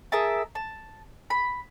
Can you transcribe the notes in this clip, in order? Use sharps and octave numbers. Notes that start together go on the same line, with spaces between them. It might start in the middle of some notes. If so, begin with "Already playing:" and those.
G#4 A#4 E5 A5
A5
B5